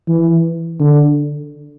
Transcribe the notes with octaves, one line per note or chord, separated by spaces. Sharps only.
E3
D3